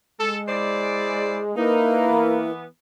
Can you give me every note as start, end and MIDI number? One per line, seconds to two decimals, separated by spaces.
0.20 1.53 56
0.20 0.39 69
0.48 1.40 64
0.48 1.40 72
0.48 1.40 74
1.56 2.45 58
1.56 2.06 63
1.56 2.51 64
1.56 2.51 70
1.56 2.51 71
2.08 2.65 52
2.08 2.65 59